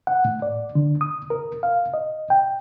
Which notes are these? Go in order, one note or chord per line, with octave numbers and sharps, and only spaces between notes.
F#5
A2
D5
D3
D#6
A#4
F5
D#5
G5